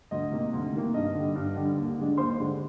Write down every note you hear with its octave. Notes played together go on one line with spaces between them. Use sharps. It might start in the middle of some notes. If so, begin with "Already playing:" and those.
D2 D#5
C3 D#3 A#3
D2
C3 D#3 A#3
G2 D#5
D3 G3
G2
D3 G3
D#2
D3 G#3 D4
D#2 C5 C6
D3 G#3 D4